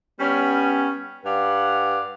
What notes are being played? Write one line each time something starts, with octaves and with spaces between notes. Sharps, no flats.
G3 B3 C#4
G2 B4 D5 F5 F#5